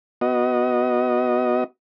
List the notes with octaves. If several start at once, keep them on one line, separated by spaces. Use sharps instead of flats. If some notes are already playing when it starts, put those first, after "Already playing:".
B3 F#4 D#5